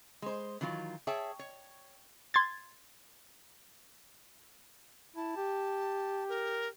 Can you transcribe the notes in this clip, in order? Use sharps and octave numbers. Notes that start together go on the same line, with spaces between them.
G#3 C5
D#3 E3 F#3 F4
G#4 C#5 E5 G5 A5
C#5
C6 G#6 A6
E4 A5
G4
A#4